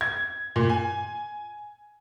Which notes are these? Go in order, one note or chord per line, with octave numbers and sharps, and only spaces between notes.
G#6
A#2
G#5